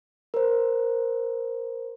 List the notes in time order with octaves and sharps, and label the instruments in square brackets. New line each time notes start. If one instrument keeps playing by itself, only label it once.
[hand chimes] A#4 C5